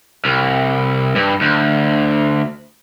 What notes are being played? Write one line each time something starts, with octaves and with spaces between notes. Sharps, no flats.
C2
G2
D2